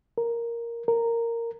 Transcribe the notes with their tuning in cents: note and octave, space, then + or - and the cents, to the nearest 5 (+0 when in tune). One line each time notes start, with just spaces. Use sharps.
A#4 +0
A#4 -10